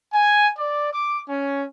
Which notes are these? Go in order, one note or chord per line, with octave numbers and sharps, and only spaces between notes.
G#5
D5
D6
C#4